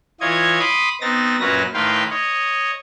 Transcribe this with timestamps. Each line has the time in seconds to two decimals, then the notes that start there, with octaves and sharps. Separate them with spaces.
0.21 E3 F4 C#5 D#5 G#6
0.59 B5 C6 D6 D#6
1.01 B3 C4 D#4 A6 A#6
1.40 F#2 A#2 F#3 C#4 B4 A#6
1.74 A2 D#3 B4 F5 G5 C6
2.10 C#5 D#5